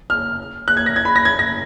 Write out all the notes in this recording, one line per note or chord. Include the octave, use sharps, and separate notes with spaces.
F6
F#6
G#6
A#6
G#6
B5
A#6
G#6
A#6